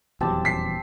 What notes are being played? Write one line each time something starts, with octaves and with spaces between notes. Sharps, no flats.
D#1 E2 F#3 C4 G4 A5
B6 C7